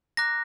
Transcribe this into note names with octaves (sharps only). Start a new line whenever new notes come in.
A#5 D6 F#6 A#6